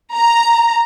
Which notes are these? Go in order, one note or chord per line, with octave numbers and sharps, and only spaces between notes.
A#5